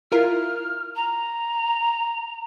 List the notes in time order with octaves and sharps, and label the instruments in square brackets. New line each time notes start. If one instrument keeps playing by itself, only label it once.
[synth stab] E4 F4 A#4 [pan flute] F6
[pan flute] A#5